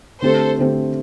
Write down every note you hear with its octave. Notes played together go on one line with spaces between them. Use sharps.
D3 A3 C4 G4 A4 C5
D3 A3 C4 G4